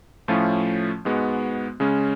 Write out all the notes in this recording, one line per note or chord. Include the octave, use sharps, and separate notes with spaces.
A2 F3 A3 C#4 F4
G#2 G#3 B3 F#4
C#3 G#3 C#4